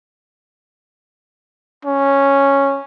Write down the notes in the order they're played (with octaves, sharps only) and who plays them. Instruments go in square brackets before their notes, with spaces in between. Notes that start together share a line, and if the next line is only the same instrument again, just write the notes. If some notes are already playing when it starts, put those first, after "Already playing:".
[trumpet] C#4